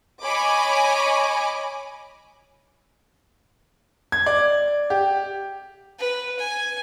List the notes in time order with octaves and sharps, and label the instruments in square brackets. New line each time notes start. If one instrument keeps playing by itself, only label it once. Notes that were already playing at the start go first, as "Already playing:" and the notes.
[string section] C#5 D#5 G#5 B5 D6
[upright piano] G#6
D5
G4
[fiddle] B4
G#5